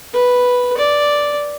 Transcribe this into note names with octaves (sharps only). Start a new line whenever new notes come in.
B4
D5